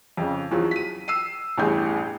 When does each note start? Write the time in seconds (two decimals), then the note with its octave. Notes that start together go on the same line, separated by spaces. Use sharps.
0.17 F2 C#3
0.51 E2 F3 F#3
0.71 B6 D#7
1.08 E6 C7 D#7
1.58 A1 E2 G2 G#4 G6